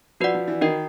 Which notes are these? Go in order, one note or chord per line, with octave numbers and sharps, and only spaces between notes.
F3 F#4 B4 D5 F#5
F3
E3
D#3 F#4 A#4 D#5 G5